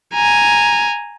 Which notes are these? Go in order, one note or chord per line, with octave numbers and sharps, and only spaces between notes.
G#5 A#5